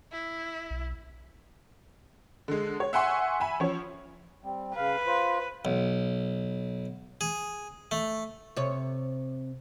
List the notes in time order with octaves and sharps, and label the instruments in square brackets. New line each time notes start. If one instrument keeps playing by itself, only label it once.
[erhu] E4
[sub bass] B1
[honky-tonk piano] D3 G#3
C#5
E5 F#5 G#5 C6 C#6
E5 G#5 B5
F3 C#4 C#5
[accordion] G3 C4
[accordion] C#3 F5 [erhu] B4
[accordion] F4 C5
[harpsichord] B1
G#4
A3
[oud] C3 C#5